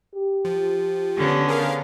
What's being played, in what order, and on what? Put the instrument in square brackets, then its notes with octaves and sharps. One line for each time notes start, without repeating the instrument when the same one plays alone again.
[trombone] G4
[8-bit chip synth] F3
[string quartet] D3 [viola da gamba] B3 C#4
[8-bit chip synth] G#4 A#4 F5